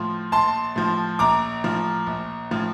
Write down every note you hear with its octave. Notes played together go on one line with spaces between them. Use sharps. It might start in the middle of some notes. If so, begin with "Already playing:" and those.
Already playing: A2 F3 C6
A#1 A5 C6
A2 F3
A#1 A#5 D6
A2 F3
A#1
A2 F3